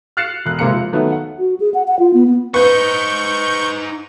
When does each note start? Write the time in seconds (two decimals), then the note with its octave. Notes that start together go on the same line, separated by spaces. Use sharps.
0.17 F6 F#6 A6 C7 C#7 E7
0.46 E1 F#6
0.59 B1 C3 G#3 A#3 A#5 C#7
0.73 F3
0.93 D#3 F#3 A3 B3 F#4
1.12 F#5
1.39 F#4
1.60 G#4
1.74 F#5
1.88 F#5
1.99 F4
2.14 B3
2.27 B3
2.54 D#4 B4 C5 C#6 G6